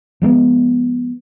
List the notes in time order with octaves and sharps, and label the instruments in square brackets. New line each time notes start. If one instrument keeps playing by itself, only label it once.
[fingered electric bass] F3 G#3 A#3 B3